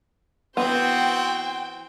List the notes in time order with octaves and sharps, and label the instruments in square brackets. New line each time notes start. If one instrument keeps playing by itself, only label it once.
[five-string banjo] E3 B3 [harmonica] C4 F#4 C5 [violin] G5